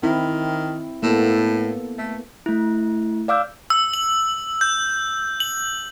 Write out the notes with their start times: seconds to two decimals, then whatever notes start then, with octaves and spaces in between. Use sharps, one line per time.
0.03 D#3 C4 E4
1.03 A2 A#3 B3 A4
1.98 A3
2.46 A3 E4
3.28 D5 F5 D6 E6 G6
3.70 E6
3.94 F#7
4.61 G6
5.40 F#7